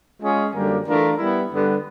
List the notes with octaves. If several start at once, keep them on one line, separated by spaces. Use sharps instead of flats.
G#3 C#4 F4 G#4
F#2 D3 G3 A#3
E3 A3 D4 F4 A#4
G3 B3 E4
G2 D3 G3 B3